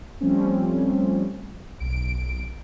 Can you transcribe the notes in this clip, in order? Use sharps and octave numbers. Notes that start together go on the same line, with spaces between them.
F3 G3 A3 C4 C#4
B1 D7